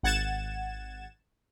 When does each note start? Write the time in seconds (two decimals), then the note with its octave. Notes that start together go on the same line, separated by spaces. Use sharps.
0.03 G#1 F#5 G#6 A6 E7